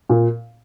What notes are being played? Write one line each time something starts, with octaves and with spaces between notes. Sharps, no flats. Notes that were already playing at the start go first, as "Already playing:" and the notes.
A#2